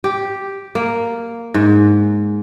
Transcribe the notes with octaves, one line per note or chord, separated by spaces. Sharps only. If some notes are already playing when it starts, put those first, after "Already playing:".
G4
A#3
G#2